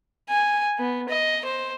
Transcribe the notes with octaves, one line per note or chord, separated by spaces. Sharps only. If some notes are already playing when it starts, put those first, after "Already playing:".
G#5
B3
D#5
C5